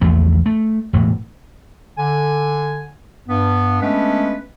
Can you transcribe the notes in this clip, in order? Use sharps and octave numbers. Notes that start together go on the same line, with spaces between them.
A#1 E2 A3
A3
E1 A2
D3 G#5
G2 B3
G#3 A3 B3 C#4 D4 B4